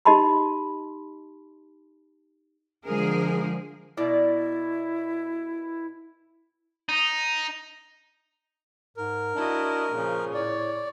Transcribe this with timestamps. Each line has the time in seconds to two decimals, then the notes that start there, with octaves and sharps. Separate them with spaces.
0.05 D#4 G4 D#5 A5 B5 C6
2.85 D3 F3 G#3 G#4 A#4
3.97 B2 E4 A#4 D5
6.89 D#4
8.97 G#2 A#4
9.35 D4 E4 F#4 D#5
9.93 A#2 C#3 F3
10.34 A2 C#5 D5